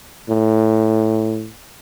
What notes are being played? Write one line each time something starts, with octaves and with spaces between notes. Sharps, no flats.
A2